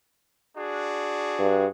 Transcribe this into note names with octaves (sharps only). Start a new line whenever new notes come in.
D4 F#4 G#4
G2